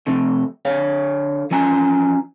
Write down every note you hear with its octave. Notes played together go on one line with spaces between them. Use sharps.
F2 C3 A3
D3 C#5 F5
E3 F3 C#4 G#5 A#5